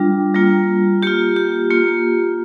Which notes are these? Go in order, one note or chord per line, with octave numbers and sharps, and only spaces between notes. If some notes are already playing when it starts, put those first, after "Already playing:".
Already playing: G3 D4 F4
G3 A#3 F4
A#3 F4 G4
G4
A#3 F4